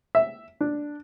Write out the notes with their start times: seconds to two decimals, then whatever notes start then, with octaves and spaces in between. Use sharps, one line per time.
0.15 E5
0.61 D4